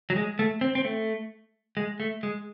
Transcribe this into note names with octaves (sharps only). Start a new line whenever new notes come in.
F#3
G#3
A3
C4
C4
A3
G#3
A3
G#3